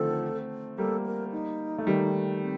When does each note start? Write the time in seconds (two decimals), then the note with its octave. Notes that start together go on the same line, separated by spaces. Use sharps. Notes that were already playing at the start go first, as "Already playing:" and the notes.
Already playing: D3 D#3 F3 A3 C4 A4
0.78 G3 A#3 A4
1.06 A#4
1.32 D#4
1.78 A3
1.87 D#3 G3
2.42 C4